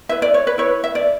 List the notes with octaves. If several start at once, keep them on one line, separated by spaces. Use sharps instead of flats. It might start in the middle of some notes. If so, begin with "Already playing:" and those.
E4 B4 E5
D5
C#5
B4
E4 B4 C#5
E5
D5